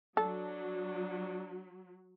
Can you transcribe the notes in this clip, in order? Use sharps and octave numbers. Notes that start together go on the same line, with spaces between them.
F#3 D4 A4